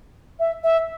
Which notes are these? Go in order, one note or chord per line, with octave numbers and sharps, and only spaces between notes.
E5
E5